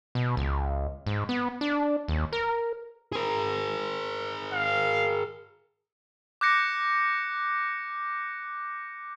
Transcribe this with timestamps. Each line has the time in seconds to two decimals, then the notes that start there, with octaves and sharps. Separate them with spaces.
0.15 B2
0.37 C#2
1.06 G#2
1.29 B3
1.61 D4
2.08 D#2
2.33 A#4
3.13 G#4 A#4
4.53 F5
6.41 D6 F#6 G6 A#6 C#7